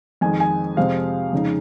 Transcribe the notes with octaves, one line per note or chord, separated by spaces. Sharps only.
F2 D#3 G#3 G#5
G#5
F2 C3 F3 G#3 F5
F2 C#3 G#3 D#4